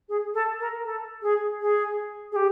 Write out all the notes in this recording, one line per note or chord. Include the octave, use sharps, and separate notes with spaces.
G#4
A4
A#4
A4
G#4
G#4
G#4
G4